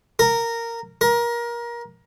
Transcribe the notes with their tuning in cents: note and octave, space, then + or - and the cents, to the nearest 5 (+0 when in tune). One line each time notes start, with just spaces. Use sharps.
A#4 -10
A#4 +25